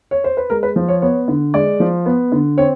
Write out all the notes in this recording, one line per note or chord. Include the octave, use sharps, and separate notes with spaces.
C#5
C5
B4
G#3 A#4
B4
F3
C#5
B3 C#5
D3
G#3 D5
F3
B3
D3
C4 C#5